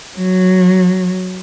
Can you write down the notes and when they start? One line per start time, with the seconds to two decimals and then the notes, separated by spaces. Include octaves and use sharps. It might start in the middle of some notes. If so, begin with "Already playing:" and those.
0.18 F#3